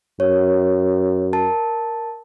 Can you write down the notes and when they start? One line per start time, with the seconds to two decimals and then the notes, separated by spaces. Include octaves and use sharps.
0.20 F#2 C#5
1.33 A#4 A5 A6